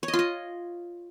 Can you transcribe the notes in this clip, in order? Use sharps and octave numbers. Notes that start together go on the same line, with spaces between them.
C#5
D#5
F4
D#5